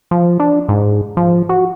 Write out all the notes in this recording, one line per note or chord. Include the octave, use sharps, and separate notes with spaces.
F3
D4
G#2
F3
F#4